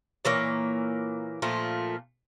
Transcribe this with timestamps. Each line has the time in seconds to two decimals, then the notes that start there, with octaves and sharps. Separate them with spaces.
0.25 A#2 E3 A#3 C#5
1.42 A#2 F3 A3 F4